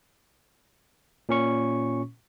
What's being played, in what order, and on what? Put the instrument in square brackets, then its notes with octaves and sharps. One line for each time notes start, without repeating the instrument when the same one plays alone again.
[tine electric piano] A#2 C#4 C#6